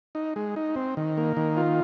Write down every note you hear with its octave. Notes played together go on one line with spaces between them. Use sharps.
D#4
G#3
D#4
C4
D#3
A#3
D#3
F4